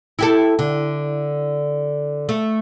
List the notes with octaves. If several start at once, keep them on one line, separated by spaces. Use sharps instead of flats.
E4 G4 A4
D3
A3